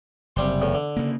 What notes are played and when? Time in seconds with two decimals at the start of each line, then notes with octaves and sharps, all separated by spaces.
0.36 F#1 C3 G3 C6
0.61 E2 A2
0.74 D3
0.97 C#3 A#3